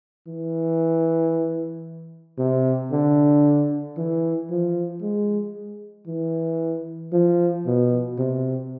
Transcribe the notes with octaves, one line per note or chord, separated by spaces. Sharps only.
E3
C3
D3
E3
F3
G#3
E3
F3
B2
C3